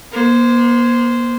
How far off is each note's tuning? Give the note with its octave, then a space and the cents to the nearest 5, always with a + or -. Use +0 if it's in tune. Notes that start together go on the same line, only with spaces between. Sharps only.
A#3 +40 C5 -10